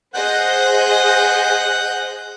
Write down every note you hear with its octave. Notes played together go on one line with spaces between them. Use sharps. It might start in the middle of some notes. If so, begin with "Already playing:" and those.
G#4 C5 D#5 F#5 F#6 G6